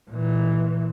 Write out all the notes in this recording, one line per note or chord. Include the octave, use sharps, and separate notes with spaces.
A#2 E3